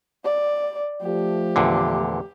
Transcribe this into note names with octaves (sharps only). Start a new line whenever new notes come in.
D5
F3 A3 G4
E2 A#2 D3